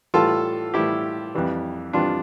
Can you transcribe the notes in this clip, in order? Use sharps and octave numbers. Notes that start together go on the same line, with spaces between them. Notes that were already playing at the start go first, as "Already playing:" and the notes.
A2 E3 G3 F4 A4
A2 E3 G3 E4 G4
F2 E3 G3
F2 E3 G3 D4 F4